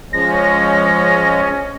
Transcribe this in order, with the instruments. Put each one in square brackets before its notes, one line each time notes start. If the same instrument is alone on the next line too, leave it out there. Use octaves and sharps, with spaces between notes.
[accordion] F3 G#3 [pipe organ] C#4 [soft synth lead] A#6